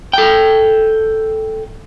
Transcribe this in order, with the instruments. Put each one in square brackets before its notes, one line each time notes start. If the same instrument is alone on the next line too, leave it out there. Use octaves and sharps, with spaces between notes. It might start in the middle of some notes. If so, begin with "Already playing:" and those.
[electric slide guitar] A4 G5